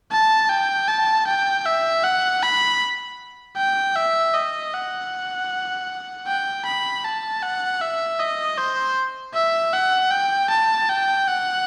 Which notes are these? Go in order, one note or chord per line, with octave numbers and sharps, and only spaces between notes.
A5
G5
A5
G5
E5
F#5
B5
G5
E5
D#5
F#5
G5
B5
A5
F#5
E5
D#5
C5
E5
F#5
G5
A5
G5
F#5